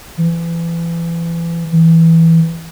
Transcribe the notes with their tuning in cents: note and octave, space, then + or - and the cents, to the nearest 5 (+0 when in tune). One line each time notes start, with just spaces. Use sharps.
E3 +30
E3 -5